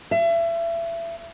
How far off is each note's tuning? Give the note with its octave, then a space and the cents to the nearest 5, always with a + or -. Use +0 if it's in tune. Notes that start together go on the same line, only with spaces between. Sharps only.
E5 +30